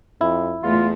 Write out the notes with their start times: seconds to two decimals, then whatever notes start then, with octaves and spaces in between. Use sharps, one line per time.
0.21 F2 E4
0.63 E2 G#3 A3 F4